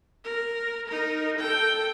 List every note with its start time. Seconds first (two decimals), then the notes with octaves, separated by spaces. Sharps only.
0.24 A#4
0.88 D#4 A#4
1.38 A4 G5